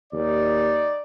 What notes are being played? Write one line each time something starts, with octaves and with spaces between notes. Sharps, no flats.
D#2 D#4 D5